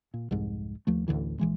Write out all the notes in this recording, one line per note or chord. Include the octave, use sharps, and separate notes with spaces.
A#2
C2 F2 G#2
D#2 F3 A3
A1 D2 D3 E3
A#1 E3 G#3